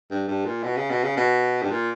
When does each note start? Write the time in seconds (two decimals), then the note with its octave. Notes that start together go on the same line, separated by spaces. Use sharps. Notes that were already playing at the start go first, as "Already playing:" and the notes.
0.11 G2
0.28 G2
0.46 A#2
0.64 B2
0.77 C#3
0.90 B2
1.03 C#3
1.17 B2
1.62 G2
1.71 A#2